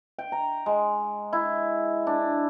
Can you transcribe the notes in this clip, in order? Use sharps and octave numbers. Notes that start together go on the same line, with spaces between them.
G5
A#5
G#3
E4
D4